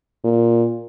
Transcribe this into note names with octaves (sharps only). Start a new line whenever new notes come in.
A#2